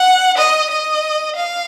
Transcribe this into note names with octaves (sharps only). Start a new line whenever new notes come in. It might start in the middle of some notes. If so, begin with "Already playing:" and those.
Already playing: F#5
D#5
D#5
F5